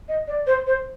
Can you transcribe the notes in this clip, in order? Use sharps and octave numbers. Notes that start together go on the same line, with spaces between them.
D#5
D5
C5
C5